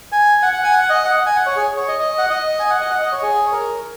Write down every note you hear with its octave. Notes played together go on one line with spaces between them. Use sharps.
G#5
F#5
F#5
G#5
F#5
D#5
F#5
G#5
F#5
C#5
G#4
C#5
D#5
D#5
F#5
D#5
G#5
F#5
D#5
F#5
D#5
C#5
G#4
C#5
A#4